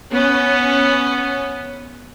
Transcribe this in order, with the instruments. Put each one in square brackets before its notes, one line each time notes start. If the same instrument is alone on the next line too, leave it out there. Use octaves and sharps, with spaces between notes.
[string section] B3 C#4